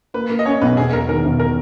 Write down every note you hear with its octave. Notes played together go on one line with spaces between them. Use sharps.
A#3 B4
A#3
D#5
C#4 C#5
B1 B4
E1 G#4
E2 A#4
D#3 A#4
E1
A#4